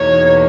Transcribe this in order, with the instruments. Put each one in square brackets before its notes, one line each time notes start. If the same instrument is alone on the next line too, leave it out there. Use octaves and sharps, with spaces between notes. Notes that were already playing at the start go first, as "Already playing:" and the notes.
Already playing: [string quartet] E2 B2 A#3 D#4 [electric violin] C#5